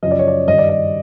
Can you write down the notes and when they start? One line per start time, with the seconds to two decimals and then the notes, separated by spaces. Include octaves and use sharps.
0.03 F#2 C#3 F3 D#5
0.11 D5
0.19 C#5
0.27 D5
0.48 G2 D#3 D#5
0.58 D5
0.69 D#5